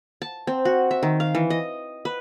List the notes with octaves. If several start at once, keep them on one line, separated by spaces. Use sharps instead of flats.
A5
C4
F#4
E5
D#3
F5
E3
D#5
B4